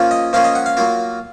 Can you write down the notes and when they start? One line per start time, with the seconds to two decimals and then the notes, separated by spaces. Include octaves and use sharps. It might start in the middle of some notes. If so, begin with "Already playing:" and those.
Already playing: F3 A#3 C#4 F4
0.11 D#5
0.33 F3 A#3 C#4 F4 F5
0.44 D#5
0.55 F#5
0.66 F5
0.77 F#3 A#3 F4